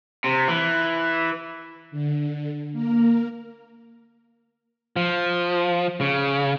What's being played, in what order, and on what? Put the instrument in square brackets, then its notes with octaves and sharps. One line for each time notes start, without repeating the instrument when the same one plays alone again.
[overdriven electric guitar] C3
E3
[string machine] D3
A#3 A#4
[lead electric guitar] F3
C#3